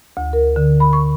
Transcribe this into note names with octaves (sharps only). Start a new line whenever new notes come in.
D2
A#4
D3
B5
C#6